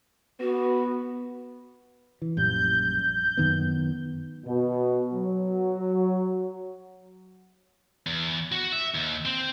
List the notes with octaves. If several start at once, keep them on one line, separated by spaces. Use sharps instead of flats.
B3 F#4
E3
A#1 F#2 G3 G6
F#2 D#3 B3
B2
F#3
E2
F#4
E5
D#2
C4